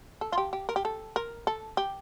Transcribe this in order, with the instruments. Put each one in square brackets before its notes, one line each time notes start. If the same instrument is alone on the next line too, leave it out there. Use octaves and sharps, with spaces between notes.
[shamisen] A4
F4
G4
G4
A#4
G4
A4
A#4
A4
G4